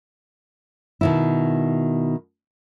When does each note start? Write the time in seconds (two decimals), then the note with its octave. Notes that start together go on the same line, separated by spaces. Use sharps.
1.01 B2 D#3 E4